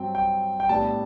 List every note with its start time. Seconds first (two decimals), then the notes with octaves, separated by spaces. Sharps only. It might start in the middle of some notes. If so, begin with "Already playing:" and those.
Already playing: G2 F#3 C4 G5
0.15 G5
0.60 G5
0.69 A2 G3 B3 D4 A5